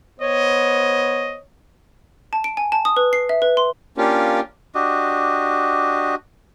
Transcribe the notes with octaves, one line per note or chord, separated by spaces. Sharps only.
B3 C5 C#5 D#5
A5
D7
G#5
A5
D#6
B4
C7
E5
B4
C6
A#3 C#4 D4 F4 G4
D4 F#4 G4 D#5